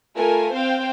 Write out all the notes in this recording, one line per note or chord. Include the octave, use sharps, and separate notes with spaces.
A3 F4 A#4 G#5
C4 C5 F5 G5